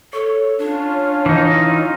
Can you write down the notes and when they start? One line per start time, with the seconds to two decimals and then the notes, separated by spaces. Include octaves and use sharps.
0.13 A4 C#5
0.58 C#4 D4 F4
1.26 E3 D#4